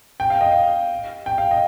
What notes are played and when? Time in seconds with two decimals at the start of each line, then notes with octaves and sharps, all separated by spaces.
0.20 G5
0.30 F5
0.41 D#5
0.51 F5
1.26 G5
1.38 F5
1.51 D#5